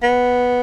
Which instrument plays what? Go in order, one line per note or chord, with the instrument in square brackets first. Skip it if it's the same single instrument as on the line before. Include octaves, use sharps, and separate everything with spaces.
[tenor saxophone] B3